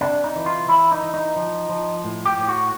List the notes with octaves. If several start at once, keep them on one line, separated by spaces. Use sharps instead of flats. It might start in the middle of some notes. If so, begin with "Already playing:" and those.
C3 D4
D#4
E3
F4
E3 E4
D#4
E3
D#4
F3
F3
A2
G4
A2
F#4